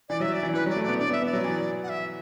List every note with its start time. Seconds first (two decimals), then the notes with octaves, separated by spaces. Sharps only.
0.09 E3 D5
0.20 F#3 E5
0.34 D5
0.43 E3
0.54 E3 B4
0.66 F#3 D5
0.77 A3
0.84 B3 D5
0.99 D4 D5
1.10 B3 E5
1.22 B3 D5
1.33 F#3
1.44 E3
1.83 F#5
1.89 E5